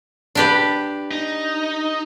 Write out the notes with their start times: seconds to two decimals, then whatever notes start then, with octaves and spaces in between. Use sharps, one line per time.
0.35 D4 G4 B4
1.11 D#4